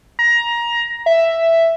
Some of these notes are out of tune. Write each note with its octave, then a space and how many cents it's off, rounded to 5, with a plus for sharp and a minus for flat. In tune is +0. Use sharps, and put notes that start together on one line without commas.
A#5 +20
E5 +5